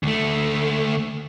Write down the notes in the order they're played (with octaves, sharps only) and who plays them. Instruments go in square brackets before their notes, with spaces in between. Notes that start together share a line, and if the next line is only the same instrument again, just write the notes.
[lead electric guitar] D2 A3